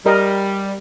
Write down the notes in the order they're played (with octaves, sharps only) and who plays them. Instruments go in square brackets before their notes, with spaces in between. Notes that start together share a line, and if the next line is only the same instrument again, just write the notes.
[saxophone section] G3 [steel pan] A#4 D#5